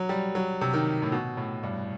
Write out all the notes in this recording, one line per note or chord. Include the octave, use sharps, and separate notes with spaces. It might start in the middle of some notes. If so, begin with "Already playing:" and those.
Already playing: F#3
G3
F#3
C3
D#3
A2
B2
A2
G2